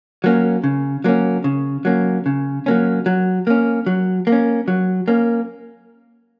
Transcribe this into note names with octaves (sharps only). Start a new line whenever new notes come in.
F#3 A#3 C#4
C#3
F#3 A#3 C#4
C#3
F#3 A#3 C#4
C#3
F#3 A#3 C#4
F#3
A#3 C#4
F#3
A#3
C#4
F#3
A#3 C#4